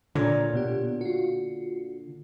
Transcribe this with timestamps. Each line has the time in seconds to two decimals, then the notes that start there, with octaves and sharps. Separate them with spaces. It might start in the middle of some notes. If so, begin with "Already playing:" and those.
0.15 A#2 D3 A#4 C#5 D5
0.53 B2 B3 G4
1.01 F4 F#4